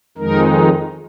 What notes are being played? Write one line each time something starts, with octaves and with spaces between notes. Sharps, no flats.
F2 D#3 G#3 D#4 A#4